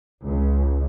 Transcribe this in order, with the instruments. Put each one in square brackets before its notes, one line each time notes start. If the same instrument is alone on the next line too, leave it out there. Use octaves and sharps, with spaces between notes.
[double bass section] C#2